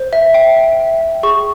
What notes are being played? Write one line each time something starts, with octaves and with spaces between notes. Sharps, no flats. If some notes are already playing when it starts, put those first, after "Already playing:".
Already playing: C5
E5
G5
E5
E5
G5
G#4 C#6